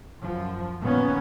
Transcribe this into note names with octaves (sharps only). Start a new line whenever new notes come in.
F#2 F3
A#2 D#3 B3 C#4